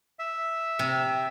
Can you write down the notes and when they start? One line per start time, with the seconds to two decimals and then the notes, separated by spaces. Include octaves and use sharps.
0.19 E5
0.79 C3